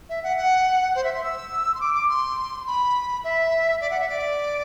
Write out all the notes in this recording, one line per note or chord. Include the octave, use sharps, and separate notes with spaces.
E5
F#5
F#5
C5
E5
C6
E6
C6
D6
D6
C6
B5
E5
D5
F#5
E5
D5